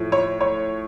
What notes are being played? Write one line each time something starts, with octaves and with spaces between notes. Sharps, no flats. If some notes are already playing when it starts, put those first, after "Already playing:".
Already playing: A2 F3
C#5
C#5